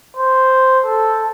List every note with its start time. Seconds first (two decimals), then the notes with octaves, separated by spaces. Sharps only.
0.16 C5
0.85 A4